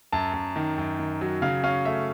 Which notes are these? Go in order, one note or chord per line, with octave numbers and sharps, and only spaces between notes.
F#2 A5
F#2
D#3
F#2
D#3
F#3
C#3 F5
C#4 F5
A3 E5